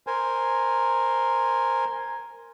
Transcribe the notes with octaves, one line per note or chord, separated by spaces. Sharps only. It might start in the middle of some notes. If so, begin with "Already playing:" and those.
A#4 C5 G#5